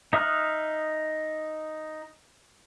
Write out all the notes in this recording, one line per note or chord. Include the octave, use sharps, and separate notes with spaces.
D#4 E5 D#6 F6 F#6